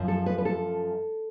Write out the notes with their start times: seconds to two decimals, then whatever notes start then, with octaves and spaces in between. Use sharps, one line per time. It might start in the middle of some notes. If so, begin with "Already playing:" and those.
Already playing: F#2 F3
0.08 A4
0.26 B4
0.38 B4
0.45 A4